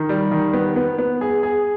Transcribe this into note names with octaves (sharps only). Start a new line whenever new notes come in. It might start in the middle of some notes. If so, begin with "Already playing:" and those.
Already playing: D#3
G3
D#3
B3
B3
B3
G#4
G#4